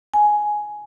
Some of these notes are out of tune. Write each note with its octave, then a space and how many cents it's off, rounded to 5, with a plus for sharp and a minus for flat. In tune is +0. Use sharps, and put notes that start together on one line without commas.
G#5 +10